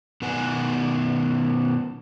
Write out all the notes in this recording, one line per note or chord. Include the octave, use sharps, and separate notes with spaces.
B2 D#3 B4 F#5 G#5